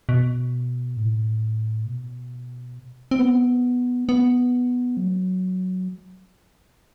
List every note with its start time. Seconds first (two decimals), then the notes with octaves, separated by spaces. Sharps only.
0.09 B2
0.97 A2
1.86 B2
3.11 C4
3.19 B3
4.09 B3
4.97 F#3